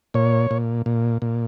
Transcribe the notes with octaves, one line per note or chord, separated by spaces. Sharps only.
A#2 C#5
A#2
A#2
A#2